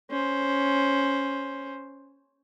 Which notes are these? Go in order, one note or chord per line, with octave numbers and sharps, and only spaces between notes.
C#4 C5